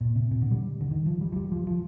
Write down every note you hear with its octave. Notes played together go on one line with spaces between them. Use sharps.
A#2
C3
A#2
D3
G3
D3
D#3
F3
G3
F3
G3
F3
F3